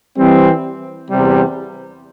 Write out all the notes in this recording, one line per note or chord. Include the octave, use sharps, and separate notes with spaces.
E3 G3 C4
E2 C3 G3